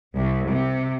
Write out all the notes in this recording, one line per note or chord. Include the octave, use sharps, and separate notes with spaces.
C2
C3